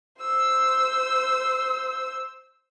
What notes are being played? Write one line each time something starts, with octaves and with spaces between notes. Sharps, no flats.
C5 E6